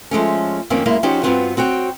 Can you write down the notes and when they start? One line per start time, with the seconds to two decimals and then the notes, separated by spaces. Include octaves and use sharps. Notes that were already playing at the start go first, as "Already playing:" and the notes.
0.11 F3 G#3 A3 C#4
0.70 F2 D#3 A#3 C4 C#4
0.86 F#2 G#3 A#3 E4
1.03 F3 C#4 D#4 F#4 G4 C5
1.23 G2 D3 B3 C4 F4 F#4
1.57 C4 F#4 C#5 G5